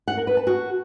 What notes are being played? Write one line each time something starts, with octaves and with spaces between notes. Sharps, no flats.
F#5
A#4
B4
A5
F#4